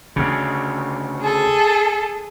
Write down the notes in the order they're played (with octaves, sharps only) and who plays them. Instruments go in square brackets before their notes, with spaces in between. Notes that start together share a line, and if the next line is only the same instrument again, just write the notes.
[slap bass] D2 C#3
[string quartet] G#4 A4